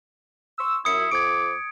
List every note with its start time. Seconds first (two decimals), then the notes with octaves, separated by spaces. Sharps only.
0.58 C6 C#6 E6
0.85 F#2 E4 D#6 C#7
1.11 F2 C4 D6 G#6 D7